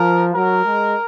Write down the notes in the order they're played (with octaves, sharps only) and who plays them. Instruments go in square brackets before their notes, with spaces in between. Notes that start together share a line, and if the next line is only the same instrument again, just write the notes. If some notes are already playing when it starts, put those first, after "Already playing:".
Already playing: [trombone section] F3 [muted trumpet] A#4
[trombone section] F#3 [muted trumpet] A#4
[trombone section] G#3